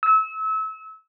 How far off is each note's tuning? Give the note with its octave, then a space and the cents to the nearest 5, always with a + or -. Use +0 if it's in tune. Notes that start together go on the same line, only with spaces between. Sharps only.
E6 -30